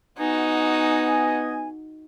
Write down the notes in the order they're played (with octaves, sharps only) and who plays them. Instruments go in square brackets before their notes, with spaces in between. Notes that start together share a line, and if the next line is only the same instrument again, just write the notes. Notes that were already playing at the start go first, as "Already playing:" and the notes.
[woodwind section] B3 D#5 G#5 [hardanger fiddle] D#4 F#4